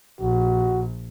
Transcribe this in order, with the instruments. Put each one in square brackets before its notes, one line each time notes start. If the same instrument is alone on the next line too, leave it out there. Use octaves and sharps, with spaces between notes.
[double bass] A#1 [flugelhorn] F#4